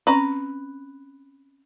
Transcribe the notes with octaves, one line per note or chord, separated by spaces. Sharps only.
C4 C#4 B4 A#5